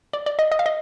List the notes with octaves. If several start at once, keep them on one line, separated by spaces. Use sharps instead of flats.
D5
D5
D#5
D#5
F5
D#5